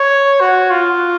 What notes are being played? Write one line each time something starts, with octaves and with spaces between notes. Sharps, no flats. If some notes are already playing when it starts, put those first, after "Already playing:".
Already playing: C#5
F#4
F4